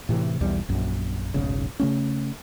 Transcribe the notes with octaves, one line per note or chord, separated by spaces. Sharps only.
A2 C3 E3
B1 E2 G3
A#1 F#2
F1 B1 G#2 C#3
C#3 A3 C#4